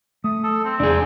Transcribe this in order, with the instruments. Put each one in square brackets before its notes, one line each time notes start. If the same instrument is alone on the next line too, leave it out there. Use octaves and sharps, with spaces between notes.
[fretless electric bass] A3 [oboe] D#6
[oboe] A4
C4
[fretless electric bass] E1 [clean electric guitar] D4 G#4